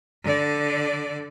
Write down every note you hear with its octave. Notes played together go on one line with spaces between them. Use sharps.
D3 D5